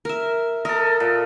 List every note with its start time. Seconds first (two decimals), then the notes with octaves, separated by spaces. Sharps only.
0.05 A#4 E5
0.65 A4 A#4 D#5
1.00 A#2